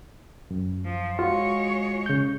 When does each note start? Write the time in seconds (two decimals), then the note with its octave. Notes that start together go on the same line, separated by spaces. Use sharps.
0.51 F#2
0.85 F3
1.19 G#3 F4 F#4 C#5
2.06 C#3 G6